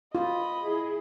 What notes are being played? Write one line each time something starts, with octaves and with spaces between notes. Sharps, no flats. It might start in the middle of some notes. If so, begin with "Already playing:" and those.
F4 D#5 B5
E4 G#4